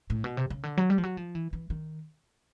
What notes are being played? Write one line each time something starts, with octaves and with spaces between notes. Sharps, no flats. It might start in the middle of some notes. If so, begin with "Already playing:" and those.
A2
B2
C3
C#3
D3
F#3
G3
F3
F#3
F3
E3
E3
D#3